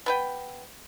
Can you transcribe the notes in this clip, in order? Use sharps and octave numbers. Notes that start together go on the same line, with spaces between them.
B3 B4 G5